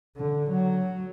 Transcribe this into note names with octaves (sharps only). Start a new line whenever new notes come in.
D3
F#3